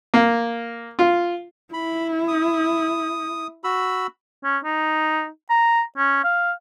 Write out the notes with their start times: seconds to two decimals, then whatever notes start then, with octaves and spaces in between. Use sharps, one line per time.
0.14 A#3
0.99 F4
1.73 E4 B5
2.28 D#6
3.64 F#4 B5 E6
4.44 C#4
4.65 D#4
5.50 A#5
5.97 C#4
6.24 F5